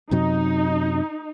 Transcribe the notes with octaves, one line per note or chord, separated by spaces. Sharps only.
F#2 C3 F#3 D#4